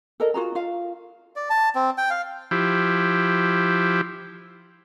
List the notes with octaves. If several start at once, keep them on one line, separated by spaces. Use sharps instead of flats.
A4 A#4 D#5
F4 F#4 G#4 A#5
F4 F5
D5
A5
C4
G5
F5
F3 E4 G4